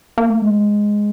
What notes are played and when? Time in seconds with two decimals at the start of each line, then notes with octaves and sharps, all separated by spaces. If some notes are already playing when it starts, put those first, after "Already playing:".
0.18 A#3
0.30 A3
0.42 G#3